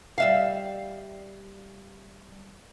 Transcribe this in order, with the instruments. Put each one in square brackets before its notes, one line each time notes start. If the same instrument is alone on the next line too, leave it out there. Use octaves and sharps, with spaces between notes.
[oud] G3 E5 F5